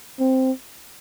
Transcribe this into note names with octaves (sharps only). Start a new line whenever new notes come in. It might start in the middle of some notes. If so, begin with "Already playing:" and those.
C4